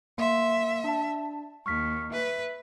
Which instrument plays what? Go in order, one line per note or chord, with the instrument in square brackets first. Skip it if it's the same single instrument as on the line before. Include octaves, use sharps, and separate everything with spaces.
[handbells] A#3 C6 [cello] E5
[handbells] D4 A5
[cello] D#2 [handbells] C#6 F6 B6
[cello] B4 [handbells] E5